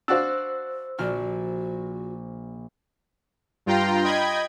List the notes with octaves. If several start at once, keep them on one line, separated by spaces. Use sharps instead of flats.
D4 F#4 C5 F5 E6
A#1 F#4 F6
G2 F4 G5 A#5 C6
D#5 G5 B5 G#6